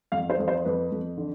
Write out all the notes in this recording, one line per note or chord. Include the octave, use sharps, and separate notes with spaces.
F2 F5
C5
F2
C5
F2 B4
F2
D3